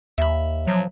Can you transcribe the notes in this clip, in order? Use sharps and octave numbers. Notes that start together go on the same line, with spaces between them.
D#2 E5 B5
F3 F#3